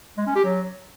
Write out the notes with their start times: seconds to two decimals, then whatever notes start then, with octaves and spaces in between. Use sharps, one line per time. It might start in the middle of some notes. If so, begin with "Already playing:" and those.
0.18 G#3
0.27 C#4
0.36 G4
0.45 F#3